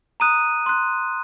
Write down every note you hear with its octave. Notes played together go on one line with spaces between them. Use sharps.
A#5 D#6 F#6 D#7
C6 F#6